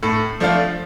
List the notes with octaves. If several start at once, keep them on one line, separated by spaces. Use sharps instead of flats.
A2 A4
F3 A3 D4 F4